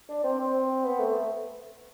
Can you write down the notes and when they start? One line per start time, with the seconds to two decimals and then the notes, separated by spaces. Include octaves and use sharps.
0.09 D4
0.24 C4
0.38 C4
0.85 B3
0.99 A3